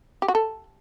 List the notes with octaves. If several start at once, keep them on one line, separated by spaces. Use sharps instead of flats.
G4
F#4
A4